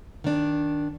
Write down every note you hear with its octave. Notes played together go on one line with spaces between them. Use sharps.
D#3 D4